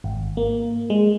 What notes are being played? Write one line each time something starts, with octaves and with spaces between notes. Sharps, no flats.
G#1
A#3
G#3